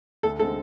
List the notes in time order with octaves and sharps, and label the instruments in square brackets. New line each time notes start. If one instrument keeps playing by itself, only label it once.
[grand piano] D2 [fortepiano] A4
[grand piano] D3 G#3 C4 [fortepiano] A4